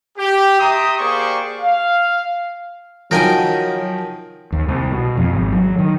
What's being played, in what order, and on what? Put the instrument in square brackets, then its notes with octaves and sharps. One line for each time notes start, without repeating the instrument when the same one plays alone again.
[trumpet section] G4
E5 G5 A#5 C6 D#6
A#3 G4 G#4 C5 D5 C#6
F5
[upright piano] D#3 F3 [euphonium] F#3 [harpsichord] A#4 G5 G#5
[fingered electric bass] D#2
C2
B2
F2
G#1
F#3
D#3